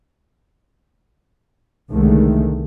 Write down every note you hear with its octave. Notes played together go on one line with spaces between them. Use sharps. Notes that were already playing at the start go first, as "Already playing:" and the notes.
C2 D3 D#3 G#3 A3